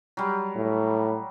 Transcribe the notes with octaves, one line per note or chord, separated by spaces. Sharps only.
F#3 G3
A2